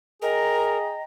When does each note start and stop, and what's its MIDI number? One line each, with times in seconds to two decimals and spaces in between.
0.22 0.96 68
0.22 0.78 70
0.22 1.03 75
0.22 1.03 79
0.22 1.03 82